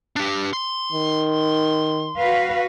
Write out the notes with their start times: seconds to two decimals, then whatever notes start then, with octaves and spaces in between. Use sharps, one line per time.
0.16 D4 G4
0.53 C6
0.93 D#3
2.17 F#4 B4 F5